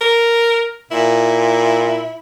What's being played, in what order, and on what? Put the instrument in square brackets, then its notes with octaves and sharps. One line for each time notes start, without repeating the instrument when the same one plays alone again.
[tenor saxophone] A#4
[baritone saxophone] A#2 [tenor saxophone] E4